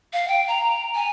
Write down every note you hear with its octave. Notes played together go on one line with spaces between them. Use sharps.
F5
G5
A#5
G#5